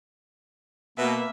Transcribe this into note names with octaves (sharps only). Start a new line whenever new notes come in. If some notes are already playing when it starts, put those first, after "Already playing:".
B2 A#3 B4 E5